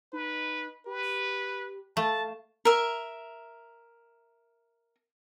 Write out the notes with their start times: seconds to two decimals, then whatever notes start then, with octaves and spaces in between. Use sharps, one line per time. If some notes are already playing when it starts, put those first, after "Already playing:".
0.13 D#4 B4
0.86 G4 B4
1.97 A3 F5 A5
2.65 A#4 E5